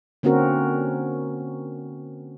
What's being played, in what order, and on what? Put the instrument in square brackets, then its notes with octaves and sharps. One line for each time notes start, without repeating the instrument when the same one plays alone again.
[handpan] D3 A#3 C4 C#4 F#4 A#4